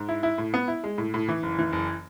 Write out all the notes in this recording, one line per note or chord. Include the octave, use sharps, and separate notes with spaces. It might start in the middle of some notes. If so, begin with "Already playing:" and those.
Already playing: G#2
E4
E4
A2
B3
E4
G#3
A2
A2
E3
F#1
E3
F#1